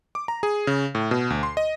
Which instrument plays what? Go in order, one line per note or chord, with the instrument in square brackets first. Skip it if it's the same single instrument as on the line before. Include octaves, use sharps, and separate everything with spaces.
[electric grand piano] D6
A#5
G#4
C#3
A2
B2
D2
C6
D#5